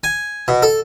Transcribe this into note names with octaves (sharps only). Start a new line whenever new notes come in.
G#5
B2
A4